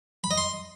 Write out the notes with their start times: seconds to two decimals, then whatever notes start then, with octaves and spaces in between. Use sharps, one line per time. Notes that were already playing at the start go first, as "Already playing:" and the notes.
0.24 B5
0.31 D#5
0.37 C6